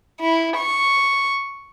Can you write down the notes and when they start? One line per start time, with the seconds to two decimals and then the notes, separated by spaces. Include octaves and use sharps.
0.20 E4
0.57 C#6